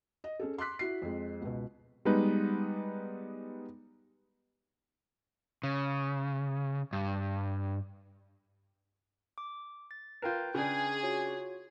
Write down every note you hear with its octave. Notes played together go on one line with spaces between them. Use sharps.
D#5
C#4 G#4 A4
C6 D6 F#6 B6
E4 F#4 C7
F2 G#3
C#2 B2
G3 G#3 B3 D#4 B4
C#3
G2
D6
A6
F4 A#4 B4 G5 G6
C#3 D4 G#4
F4 F#4 C#5